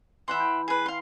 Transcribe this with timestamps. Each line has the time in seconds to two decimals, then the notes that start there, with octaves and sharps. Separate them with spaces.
0.28 E3 E5 F#5 C6
0.40 G5
0.68 G#4 B4
0.86 F5 C6